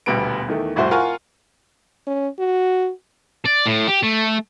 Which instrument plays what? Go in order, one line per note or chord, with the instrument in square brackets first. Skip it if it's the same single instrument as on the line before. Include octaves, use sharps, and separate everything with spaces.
[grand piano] D#1 D2 B2 G3 B3 D7
E2 D#3 A3
F1 C2 A2 E4 F#4 C5
F4 A#4 F5 F#5 G#5 C#6
[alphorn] C#4
F#4
[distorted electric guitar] D5
A2
G4
A3